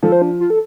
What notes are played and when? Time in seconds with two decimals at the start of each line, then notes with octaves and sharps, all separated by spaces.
0.03 F3 A4
0.12 C5
0.22 D4
0.40 F4
0.50 A4